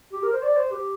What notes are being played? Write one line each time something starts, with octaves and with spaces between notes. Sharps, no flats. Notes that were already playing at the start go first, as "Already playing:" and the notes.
G4
A#4
C5
D5
C5
G4